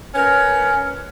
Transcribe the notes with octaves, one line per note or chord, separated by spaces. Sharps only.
C#4 A#4 B4 C#5